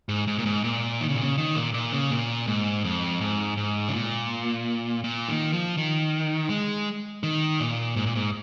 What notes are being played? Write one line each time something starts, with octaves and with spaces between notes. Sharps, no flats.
G#2
G#2
A#2
G#2
A#2
D#3
C#3
A#2
C#3
D#3
A#2
A#2
C#3
A#2
G#2
F2
G#2
G#2
C#3
A#2
A#2
D#3
F3
D#3
G#3
D#3
A#2
G#2
A#2
G#2